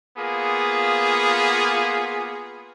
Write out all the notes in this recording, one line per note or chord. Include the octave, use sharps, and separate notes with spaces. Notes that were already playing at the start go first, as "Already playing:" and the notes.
A#3 B3 F4 G#4